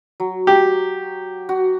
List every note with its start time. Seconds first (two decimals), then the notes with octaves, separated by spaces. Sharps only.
0.20 F#3
0.47 G4
1.49 F#4